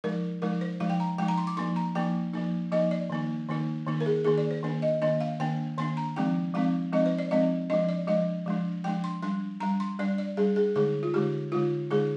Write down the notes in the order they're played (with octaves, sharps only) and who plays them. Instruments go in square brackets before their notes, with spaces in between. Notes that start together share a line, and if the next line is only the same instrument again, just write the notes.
[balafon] F3 G#3 D#4 A#4
F3 G#3 D#4 A#4
C5
F3 G#3 D#4 F5
G5
A#5
F3 G#3 D#4 G5
A#5
C6
D6
F3 A#3 D#4 C6
A#5
F3 A#3 D#4 G5
F3 A#3 D#4
F3 A#3 D#4 D#5
D5
D#3 A#3 D#4
D#3 A#3 D#4
D#3 A#3 D#4
A#4
G#4
D#3 A#3 D#4 G#4
D5
C5
D#3 A#3 D4
D#5
D#3 A#3 D4 D#5
F5
D#3 A#3 D4 G5
D#3 A#3 D4 C6
A#5
F3 G#3 C4 D#4 G5
F3 G#3 C4 D#4 F5
F3 G#3 C4 D#4 D#5
C5
D5
F3 G#3 C4 D#4 D#5
F3 G#3 D4 D#5
D5
F3 G#3 D4 D#5
F3 G#3 D4
F3 G#3 D4 G5
C6
G3 D4 C6
G3 D4 A#5
C6
G3 D4 D5
D5
G3 D4 G#4
G#4
D3 G#3 D#4 G#4
F4
D3 G#3 D#4 G4
D3 G#3 D#4 F4
D3 G#3 D#4 G#4